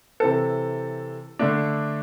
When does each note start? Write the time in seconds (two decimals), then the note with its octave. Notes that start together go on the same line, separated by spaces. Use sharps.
0.20 C3 E3 C4 A4
1.39 D3 A3 D4